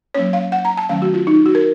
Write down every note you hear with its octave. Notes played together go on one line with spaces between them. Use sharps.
F#3 A#3 C#4 C#5
F5
F#5
A#5
A5
D#3 F#3 A3 C#4 F5
F#4
F4
D#4
F#4
A#4